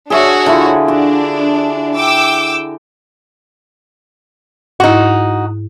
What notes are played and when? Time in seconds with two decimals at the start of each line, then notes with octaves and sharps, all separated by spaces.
0.10 D4 F#4 G#4 C#5 E5 F#5
0.46 D3 E4 F4
0.88 D4 F#4
1.97 G5 D6 E6
4.80 G#2 D#4 E4 F#4